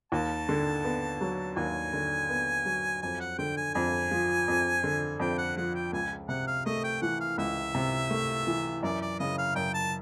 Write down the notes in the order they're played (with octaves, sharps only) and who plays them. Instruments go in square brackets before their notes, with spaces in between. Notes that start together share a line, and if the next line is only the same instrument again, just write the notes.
[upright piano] D#2 [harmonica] A5
[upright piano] D3
B3
F#3
[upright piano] D#2 [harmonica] G#5
[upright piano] D3
B3
F#3
[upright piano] F2 [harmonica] G#5
[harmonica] F#5
[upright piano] D3 [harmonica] G5
[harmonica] G#5
[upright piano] F2 [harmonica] G#5
[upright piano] F3
F2
D3
[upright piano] F2 [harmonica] G5
[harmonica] F#5
[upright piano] F3 [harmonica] F#5
[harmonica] G5
[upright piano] C#2 [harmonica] G#5
[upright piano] C3 [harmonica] F#5
[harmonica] F5
[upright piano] A3 [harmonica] D#5
[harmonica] G5
[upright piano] E3 [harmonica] F#5
[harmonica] F5
[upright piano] C#2 [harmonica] E5
[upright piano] C3
A3
E3
[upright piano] F#2 [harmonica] D5
[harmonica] D5
[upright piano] C#3 [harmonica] D#5
[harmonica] F5
[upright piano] F#2 [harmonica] G5
[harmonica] A5